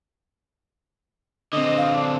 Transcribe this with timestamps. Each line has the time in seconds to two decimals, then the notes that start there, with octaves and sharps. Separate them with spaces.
1.53 D3 C4 D#5
1.78 F5
1.94 D4